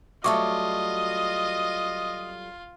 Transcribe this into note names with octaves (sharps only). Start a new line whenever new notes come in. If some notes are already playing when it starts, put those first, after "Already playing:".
F#3 G3 A3 F4 D#5 E5 C#6 D6